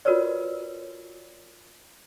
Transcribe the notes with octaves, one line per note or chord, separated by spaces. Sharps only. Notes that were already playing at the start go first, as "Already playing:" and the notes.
F4 F#4 A#4 B4 C#5 D5